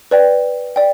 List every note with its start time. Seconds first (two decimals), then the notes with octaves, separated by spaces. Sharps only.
0.11 B4 D5 G5
0.76 D5 G5